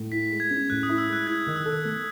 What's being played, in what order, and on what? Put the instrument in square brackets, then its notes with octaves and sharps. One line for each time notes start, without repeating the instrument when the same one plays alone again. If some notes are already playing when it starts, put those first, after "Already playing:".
Already playing: [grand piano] A2
[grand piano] E4 [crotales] B6
[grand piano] G#3
[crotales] G#6
[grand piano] C#4
[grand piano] A2 [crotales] F#6
[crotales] D#6
[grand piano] E4
[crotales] E6
[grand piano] G#3 [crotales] F#6
[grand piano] E4 [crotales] G#6
[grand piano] D#3
[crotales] E6
[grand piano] A4
A3